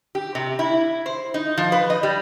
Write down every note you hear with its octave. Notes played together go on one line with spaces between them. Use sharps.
G4
C3
E4
C5
D#4
F3
B4
D#5
G3